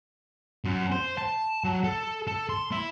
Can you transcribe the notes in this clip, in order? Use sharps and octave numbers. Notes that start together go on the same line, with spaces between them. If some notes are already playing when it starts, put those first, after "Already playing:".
F#2
C5
A5
F#3
A4
A4
C6
E4